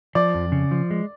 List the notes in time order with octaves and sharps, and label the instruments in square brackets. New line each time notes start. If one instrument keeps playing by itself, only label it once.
[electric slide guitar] F3 [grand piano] D5
[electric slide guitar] F2
C#3
F3
G#3